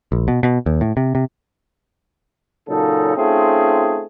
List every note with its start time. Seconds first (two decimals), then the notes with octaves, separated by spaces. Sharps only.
0.12 A#1
0.28 B2
0.43 B2
0.66 D#2
0.81 A2
0.97 C3
1.15 C3
2.68 A#2 C#3 F#3 D#4 A4
3.17 A3 C4 C#4 D#4 F4 G#4